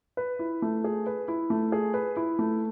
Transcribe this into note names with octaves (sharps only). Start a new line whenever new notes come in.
B4
E4
A3
G#4
B4
E4
A3
G#4
B4
E4
A3